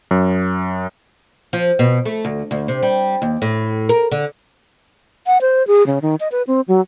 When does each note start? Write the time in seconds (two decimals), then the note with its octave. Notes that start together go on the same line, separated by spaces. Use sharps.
0.11 F#2
1.53 F3
1.79 B2
2.05 A3
2.25 D2
2.51 D2
2.68 C3
2.83 G3
3.22 D#2
3.42 A2
3.89 A#4
4.12 D3
5.27 F#5
5.41 C5
5.67 G#4
5.87 C#3
6.02 D#3
6.20 D#5
6.32 B4
6.47 C4
6.68 F#3